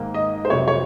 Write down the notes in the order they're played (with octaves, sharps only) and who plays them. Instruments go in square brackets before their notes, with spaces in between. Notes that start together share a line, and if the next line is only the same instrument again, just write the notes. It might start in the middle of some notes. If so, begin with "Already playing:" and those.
Already playing: [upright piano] G#2 D#3 A#3
D#5
C5
F2 C3 F#3 C#5
C#5